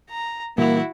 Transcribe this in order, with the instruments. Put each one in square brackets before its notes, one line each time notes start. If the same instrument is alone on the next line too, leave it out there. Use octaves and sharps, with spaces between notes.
[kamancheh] A#5
[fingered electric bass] A#2 E3 G3 [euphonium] A#3 [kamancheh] E4 F#4